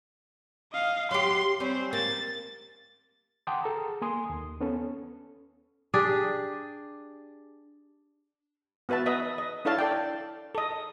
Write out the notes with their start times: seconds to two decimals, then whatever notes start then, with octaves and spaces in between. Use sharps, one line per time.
0.72 D#5 F5
1.11 F#3 G4 C6 C7
1.60 G3 C4 C#4 C5
1.93 A#3 A6
3.47 F#5 G5 A5 C6 D6 D#6
3.64 G#4 A4 A#5
4.02 A#3 G#5 C6 D#6
4.30 D#2
4.61 B3 C#4 A4
5.94 D4 G4 G#4
8.89 B3 F#4 B4 E5 A5
9.06 B4 D#5 E5
9.38 D#5
9.65 D4 E4 A4 C#5 F5 A5
9.79 A4 D5 G5
10.55 A4 D#5